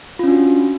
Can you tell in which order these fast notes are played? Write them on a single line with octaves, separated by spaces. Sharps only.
F4 C#4 D4 F#4